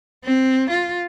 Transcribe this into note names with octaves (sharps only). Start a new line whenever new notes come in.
C4
F4